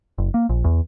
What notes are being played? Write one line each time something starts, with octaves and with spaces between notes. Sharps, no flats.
F#1
A#3
A#1
E2